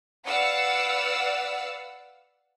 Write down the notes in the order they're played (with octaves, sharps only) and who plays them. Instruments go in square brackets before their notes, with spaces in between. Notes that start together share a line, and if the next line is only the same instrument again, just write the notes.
[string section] B4 D5 F5 F#5 E6